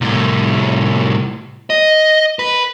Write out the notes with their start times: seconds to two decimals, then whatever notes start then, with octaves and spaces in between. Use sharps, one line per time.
0.01 C2 A2
1.70 D#5
2.39 B4